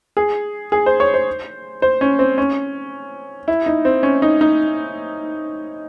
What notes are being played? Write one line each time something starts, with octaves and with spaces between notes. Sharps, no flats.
G#4
G#4
C5
C#5
C5
C5
C#4
C4
C#4
E4
D#4
C4
C#4
D#4
D#4